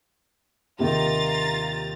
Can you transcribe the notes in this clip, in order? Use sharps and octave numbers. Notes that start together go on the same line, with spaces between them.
D#2 C3 D#3 F4 A#5 A6